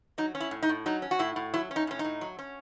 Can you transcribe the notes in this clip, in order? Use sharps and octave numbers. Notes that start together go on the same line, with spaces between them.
F#3 D#4
C#4
E4
A2
D#4
A2
F#3 D#4
C#4
F#4
A2 E4
A2
F#3 E4
C#4
D#4
A2 C#4
D#4
A2
F#3
C#4